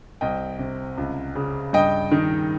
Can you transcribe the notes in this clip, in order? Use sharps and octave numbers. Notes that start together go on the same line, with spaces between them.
C2 D#5 G5
C3
C#2
C#3
G2 D#5 G5
D#3